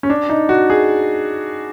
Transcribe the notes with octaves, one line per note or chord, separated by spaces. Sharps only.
C#4
D4
D#4
F#4
G#4